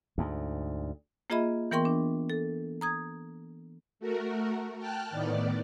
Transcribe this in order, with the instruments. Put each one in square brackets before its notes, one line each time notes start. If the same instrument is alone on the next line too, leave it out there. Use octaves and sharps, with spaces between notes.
[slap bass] D2 G#2
[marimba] A#3 F4 G#4 D#5 E5 B5
E3 B3 A#4 G5 C6 C#6
D4
A4
A#5 D#6 G#6
[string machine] A3 F#4 A#4
G5 A5 F6 F#6
A2 D#3 B3 D5